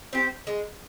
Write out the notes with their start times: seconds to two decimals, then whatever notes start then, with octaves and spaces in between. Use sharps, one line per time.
0.13 C4 G4 C5
0.47 G#3